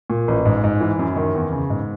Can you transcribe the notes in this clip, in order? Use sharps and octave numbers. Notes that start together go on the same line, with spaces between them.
A#2
A1
G#2
G#2
E3
F#2
D#3
E2
C#3
G#2